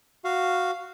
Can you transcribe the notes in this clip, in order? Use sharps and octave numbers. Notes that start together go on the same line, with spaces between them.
F#4 F5